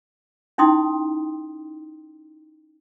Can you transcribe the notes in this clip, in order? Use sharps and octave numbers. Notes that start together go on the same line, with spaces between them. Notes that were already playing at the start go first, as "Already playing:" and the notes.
C#4 D#4 E4 G5 C6 D#6